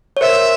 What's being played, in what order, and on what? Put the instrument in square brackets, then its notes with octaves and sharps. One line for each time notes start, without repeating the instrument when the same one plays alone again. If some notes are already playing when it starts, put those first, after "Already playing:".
[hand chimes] C#5
[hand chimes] A#4 C5 [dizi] E5